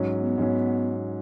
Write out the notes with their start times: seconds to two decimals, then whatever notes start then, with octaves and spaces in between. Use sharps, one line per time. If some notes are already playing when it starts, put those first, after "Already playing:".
Already playing: G#2 F#3 C#4
0.15 B3
0.38 G#2 F#3 C#4